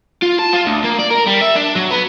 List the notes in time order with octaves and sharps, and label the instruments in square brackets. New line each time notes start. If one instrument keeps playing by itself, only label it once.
[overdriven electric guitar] F4
A5
F4
D2
A#3
D5
A#4
G3
E5
D4
F#3
B3